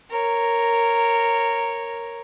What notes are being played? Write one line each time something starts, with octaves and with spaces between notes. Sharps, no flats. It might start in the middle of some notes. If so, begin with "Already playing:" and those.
A#4 C#5